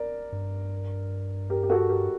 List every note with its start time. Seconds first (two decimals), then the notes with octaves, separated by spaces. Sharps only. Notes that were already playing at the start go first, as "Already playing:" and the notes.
Already playing: A#4 D5
0.32 G2
1.50 G4 A#4
1.63 G4
1.70 F#4 A4
1.89 G4 A#4